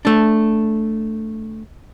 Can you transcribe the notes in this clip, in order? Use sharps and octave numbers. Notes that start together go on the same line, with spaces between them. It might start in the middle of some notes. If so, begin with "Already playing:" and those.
A3 D4